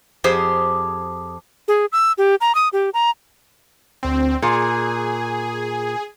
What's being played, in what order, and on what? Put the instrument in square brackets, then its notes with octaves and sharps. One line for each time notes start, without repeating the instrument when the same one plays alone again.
[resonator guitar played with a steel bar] F2 G4 G#4 C5
[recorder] G#4
E6
G4
A#5
D#6
G4
A#5
[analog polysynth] D2 C4
[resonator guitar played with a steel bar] A#2 [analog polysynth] G#4